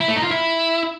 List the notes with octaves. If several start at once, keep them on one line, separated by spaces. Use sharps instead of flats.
E4
A3
D#4
F4
E4